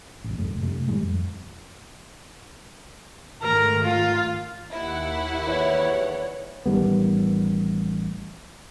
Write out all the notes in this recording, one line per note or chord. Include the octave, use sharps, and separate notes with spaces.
E1 A1
E1 C2 F#2 A3
F#2 C3 A3
A2 D#3 G3 G#3
F2
G#2 D#3 A3 A#4
F4
D#2 E4 F#5
E2 C#5
A1 D#3 G3 B3